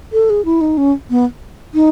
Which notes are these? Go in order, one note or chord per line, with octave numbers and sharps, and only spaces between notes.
A4
G#4
E4
D#4
C#4
B3
D#4